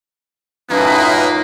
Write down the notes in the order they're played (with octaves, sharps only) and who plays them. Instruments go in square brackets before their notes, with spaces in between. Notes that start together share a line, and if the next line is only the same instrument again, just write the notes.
[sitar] F#2 A2 [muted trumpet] A#3 [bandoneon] D#4 F4 [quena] B4